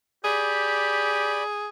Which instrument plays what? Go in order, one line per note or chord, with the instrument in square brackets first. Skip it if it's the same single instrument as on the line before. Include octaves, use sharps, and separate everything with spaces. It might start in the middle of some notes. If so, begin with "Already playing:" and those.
[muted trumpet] G4 [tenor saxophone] G#4 [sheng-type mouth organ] D5 B5